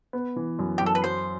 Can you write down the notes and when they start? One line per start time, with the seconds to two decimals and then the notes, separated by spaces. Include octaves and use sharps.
0.13 B3
0.36 E3
0.59 F#2
0.78 F#2 G4
0.86 A4
0.95 B4
1.03 F#3 C5